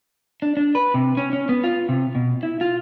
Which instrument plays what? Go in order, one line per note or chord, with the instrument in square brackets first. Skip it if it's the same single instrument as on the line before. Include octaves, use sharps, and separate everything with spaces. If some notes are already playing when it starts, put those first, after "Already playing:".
[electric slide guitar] D4
D4
B4
C3
C#4
C#4
B3
F4
C3
B2
E4
F4